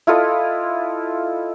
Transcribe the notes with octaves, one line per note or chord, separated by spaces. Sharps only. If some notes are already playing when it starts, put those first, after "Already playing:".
E4 F4 A4 D#5